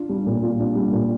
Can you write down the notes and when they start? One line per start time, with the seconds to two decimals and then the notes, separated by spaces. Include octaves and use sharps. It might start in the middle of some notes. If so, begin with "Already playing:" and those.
Already playing: D4 F4
0.09 G3
0.26 A#2
0.42 F4
0.59 D4
0.75 G3
0.92 A#2